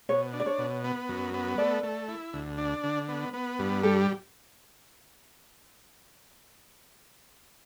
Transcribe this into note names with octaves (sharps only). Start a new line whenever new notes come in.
B2 C#5
D4
D5
C#5
B2
B3
F#2
B3
A3 D5
A3
E4
D2
D4
D3
B3
B3
G2
G3 A4